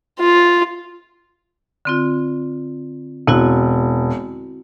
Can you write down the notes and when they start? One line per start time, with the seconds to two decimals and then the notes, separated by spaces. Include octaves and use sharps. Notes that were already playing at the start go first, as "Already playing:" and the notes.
0.20 F4
1.85 D3 C4 F4
3.27 E1 C4 E4 F#4